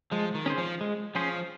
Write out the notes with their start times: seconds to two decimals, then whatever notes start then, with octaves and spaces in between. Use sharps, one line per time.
0.11 F3 G#3
0.35 D#3
0.46 C#4 G#4 C5
0.58 F3
0.81 G#3
1.15 F3 C#4 G#4 C5